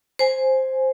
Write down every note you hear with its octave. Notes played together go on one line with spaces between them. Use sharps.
C5 G#5